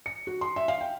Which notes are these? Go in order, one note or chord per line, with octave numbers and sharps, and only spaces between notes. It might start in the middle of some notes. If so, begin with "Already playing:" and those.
C#7
F#4
C6
E5
F5
G5